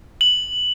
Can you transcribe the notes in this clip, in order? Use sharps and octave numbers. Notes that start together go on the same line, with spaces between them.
F#7